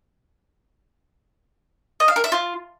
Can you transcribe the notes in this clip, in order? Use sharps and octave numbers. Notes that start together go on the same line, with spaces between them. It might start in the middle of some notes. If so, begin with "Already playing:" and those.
D#5
F5
A#4
E5
F4